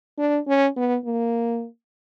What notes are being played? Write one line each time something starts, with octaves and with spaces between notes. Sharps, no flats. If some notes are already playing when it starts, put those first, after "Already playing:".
D4
C#4
B3
A#3